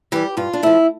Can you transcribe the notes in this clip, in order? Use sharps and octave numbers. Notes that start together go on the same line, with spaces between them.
E3 G3 G4
G2 F4
D4
F3 A3 E4